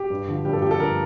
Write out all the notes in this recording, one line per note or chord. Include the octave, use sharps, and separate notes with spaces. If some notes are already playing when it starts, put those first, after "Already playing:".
Already playing: G4
G2
D3 F3
G2 G4
A4
D3 F3 G4
A4
G2 A#4